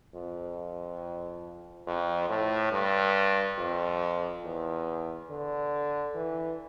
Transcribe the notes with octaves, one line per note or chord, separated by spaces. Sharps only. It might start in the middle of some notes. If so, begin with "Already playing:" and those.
F2
F2
A2
G2
F2
E2
D3
E3